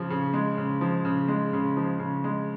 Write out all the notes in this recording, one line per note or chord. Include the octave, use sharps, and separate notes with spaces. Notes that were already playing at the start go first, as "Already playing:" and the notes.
Already playing: C#3 F3
C#3
G#3
C#3
F3
C#3
G#3
C#3
F3
C#3
G#3